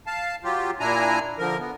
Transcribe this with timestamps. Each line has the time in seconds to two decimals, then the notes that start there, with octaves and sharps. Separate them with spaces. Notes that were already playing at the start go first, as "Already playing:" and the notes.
0.07 F5 A5
0.44 F#3 F4 G4
0.80 A#2 D4 E4 G#5 A#5
1.39 D3 F3 A#4
1.59 B3